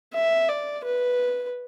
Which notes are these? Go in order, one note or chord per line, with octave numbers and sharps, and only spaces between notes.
E5
D5
B4